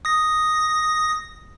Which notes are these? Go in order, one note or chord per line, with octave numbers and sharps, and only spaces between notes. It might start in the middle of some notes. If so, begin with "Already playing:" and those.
D#6 A#6